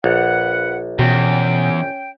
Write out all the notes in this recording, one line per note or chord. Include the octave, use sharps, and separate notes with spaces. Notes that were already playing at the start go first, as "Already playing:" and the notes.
A#1 F4 B4 F#5
E2 B2 C#4 G5